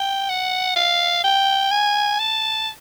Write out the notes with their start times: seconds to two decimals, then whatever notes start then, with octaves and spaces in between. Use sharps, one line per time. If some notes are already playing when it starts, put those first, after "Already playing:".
Already playing: G5
0.29 F#5
0.76 F5
1.24 G5
1.71 G#5
2.20 A5